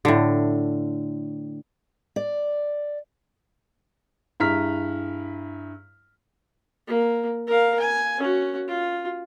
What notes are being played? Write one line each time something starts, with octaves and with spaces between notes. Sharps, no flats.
A2 D3
D5
G2 E4 G#4 A#5 F6 B6
A#3
A#4 F5
G#5
C#4 F#4
F4